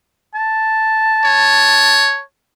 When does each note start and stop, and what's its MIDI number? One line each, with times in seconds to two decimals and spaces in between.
0.35 2.20 81
1.25 2.22 73